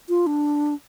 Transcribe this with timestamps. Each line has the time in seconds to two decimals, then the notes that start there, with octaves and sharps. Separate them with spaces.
0.09 F4
0.27 D4